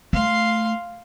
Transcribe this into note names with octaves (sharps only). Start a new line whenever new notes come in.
A3 F5 C6